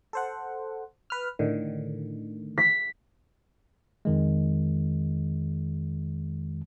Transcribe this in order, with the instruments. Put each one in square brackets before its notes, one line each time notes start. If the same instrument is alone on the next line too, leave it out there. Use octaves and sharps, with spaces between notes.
[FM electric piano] A4 C5 F#5
B4 F6
A2 D3 D#3
[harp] B6
[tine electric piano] F2 D#3 G#3